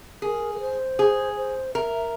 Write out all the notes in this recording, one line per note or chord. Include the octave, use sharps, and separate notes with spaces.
G#4 A#4
A#4
C5
G#4
C5
A#4 E5